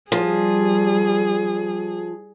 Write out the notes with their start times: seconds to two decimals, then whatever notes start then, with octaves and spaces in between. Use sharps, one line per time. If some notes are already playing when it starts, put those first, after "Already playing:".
0.12 F3 G3 G#4